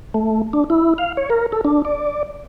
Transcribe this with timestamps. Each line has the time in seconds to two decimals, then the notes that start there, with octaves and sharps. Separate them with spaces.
0.14 A3
0.53 D4
0.70 E4
0.98 F5
1.17 C#5
1.30 A#4
1.52 A4
1.65 D4
1.85 D5